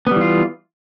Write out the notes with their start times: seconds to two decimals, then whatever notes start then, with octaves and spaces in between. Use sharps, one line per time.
0.07 B3
0.11 G3
0.16 E3
0.21 F4